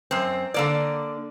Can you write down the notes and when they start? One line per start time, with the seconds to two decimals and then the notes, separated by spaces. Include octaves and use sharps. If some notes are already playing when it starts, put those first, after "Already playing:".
0.11 F#2 C4
0.54 D3 A#3 D5